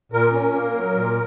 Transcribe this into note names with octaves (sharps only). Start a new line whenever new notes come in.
A#2 A#4
C#4
A#3
F#3
A#2